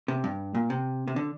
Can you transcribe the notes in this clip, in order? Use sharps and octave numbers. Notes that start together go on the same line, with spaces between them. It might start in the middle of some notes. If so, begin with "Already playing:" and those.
C3
G2
A#2
C3
C3
D3